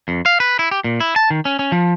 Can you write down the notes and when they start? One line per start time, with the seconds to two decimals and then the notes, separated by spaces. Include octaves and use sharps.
0.08 F2
0.26 F5
0.40 B4
0.59 E4
0.71 G4
0.84 A#2
1.00 E4
1.16 A5
1.30 D#3
1.45 C#4
1.59 C#4
1.72 F3